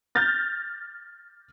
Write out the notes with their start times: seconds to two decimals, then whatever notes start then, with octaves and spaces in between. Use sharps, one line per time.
0.15 F6 G6 A6 A#6